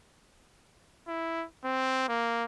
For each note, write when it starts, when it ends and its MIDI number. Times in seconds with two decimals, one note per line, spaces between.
1.08 1.45 64
1.64 2.04 60
2.08 2.45 58